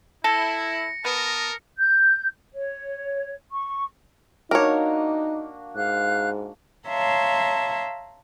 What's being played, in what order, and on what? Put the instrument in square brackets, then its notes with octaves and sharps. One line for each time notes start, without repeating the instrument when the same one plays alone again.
[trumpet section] E4 [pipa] A4 [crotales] A#6 C#7
[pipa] B3 [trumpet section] A#4 A5 D#6
[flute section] G6
C#5
C#6
[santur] A#3 D4 F#4 [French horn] D#4 [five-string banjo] A#4 C#5
[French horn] G#2 [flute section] F5 F#6
[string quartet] C#5 E5 F5 A5 A#5 C6